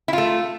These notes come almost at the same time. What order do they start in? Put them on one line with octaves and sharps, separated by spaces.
E4 F4 A3